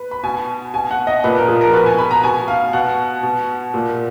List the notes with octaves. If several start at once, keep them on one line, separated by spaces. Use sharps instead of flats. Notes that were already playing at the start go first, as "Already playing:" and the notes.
Already playing: B4
B5
B2 G#5
B2 G#5
F#5
D#5
A#2 B4
A#4
F3 G#4
A#4
B2 B4
G#5
B5
A#5
B2 G#5
F5
B2 F#5
B2
A#2